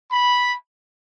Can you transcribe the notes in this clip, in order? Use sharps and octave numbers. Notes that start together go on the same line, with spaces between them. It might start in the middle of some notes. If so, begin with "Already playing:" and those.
B5